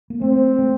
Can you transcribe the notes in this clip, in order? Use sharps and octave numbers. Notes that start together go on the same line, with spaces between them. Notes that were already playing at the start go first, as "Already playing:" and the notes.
A#3
A3 C4
A3